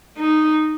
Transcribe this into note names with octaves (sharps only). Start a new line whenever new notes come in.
D#4